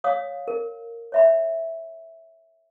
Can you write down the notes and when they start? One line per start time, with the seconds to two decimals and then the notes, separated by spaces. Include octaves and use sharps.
0.04 C#5 D5 F5 D#6
0.48 A#4
1.12 C#5 E5 B5